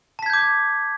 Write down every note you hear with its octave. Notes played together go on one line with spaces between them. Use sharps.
A5 D6 G6 G#6 B6